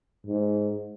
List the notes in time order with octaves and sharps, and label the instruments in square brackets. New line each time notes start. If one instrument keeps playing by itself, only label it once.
[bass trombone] G#2